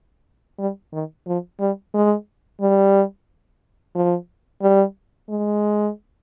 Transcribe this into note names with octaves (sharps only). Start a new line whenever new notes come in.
G3
D#3
F3
G3
G#3
G3
F3
G3
G#3